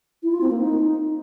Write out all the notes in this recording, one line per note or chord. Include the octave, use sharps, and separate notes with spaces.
E4
F4
C4
A#3
D#4